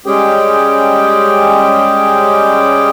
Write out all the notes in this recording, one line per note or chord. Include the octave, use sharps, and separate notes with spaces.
G3 G#3 C#4 G4 G#4 G5